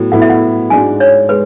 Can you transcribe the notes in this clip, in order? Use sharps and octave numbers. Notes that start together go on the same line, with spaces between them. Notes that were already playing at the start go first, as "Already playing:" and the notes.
Already playing: A2 F#3 B3
A2 F#3 B3 E4 F#5
E5
F#5
G#2 G#3 D4 F#4 G#5
C#5
G#3 B4